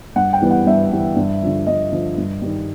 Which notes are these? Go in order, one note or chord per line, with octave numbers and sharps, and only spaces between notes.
G2 F#5
G5
E3 G3 B3
F#5
G2 E5
E3 G3 B3
G2
D3 F3
G2 D#5
D3 F3
G2
D#3 G3